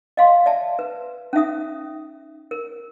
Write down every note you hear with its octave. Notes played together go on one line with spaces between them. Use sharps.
D#5 F5 C6
D5 E5 A5
B4
C#4 D#4 E5 D#6
A#4